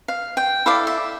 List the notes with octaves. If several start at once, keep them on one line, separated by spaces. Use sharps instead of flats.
F5
G5
E4 A4 D5 F5
E5